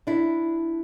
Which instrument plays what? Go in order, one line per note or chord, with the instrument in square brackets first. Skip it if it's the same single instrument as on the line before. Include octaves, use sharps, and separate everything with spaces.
[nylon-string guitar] D4 E4